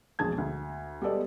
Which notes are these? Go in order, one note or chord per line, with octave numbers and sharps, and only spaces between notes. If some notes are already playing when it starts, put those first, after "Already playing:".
E1 A#1 G#4 A5 G#6
D2
G3 G#3 B3 A4 D5 D#5